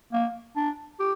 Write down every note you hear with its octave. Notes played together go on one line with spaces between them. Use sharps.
A#3
D4
G4